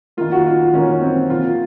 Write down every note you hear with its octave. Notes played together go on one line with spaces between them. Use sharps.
D#3 A#3 F4
F#4
F4
D#3 A#3 C#4
C4
C3 F3 A#3 F4